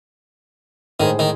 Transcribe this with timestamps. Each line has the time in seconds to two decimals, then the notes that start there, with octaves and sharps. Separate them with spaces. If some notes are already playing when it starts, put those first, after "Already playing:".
1.00 A2 D#3 G#3 D#4 G#4 C5
1.19 D#3